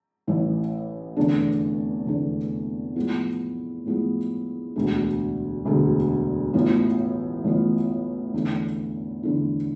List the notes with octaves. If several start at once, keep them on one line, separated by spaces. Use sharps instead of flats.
A1 A2 E3
F1 E2 D3 A3 D4
F1 E2 D3 A3 D4
A2 F3 G#3 B3 E4
A2 F3 G#3 B3 E4
E1 D2 D3 G#3
E1 D2 D3 G#3
A1 A2 E3 B3 F4
A1 A2 E3 B3 F4
E2 D3 A3 E4
E2 D3 A3 E4